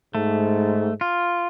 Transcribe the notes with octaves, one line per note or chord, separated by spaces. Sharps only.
G#2 A3
F4